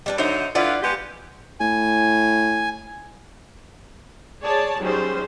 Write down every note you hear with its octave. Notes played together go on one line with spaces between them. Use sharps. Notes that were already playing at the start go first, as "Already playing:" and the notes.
G3 D4 B4
D3 F#3 D#4 C5 E5
D3 E4 F4 B4 D5 F#5
G#3 B3 G4
A2 G#5
G#4 C#5 D5 A5
F#3 G3 C#4 D#4 G#4 C5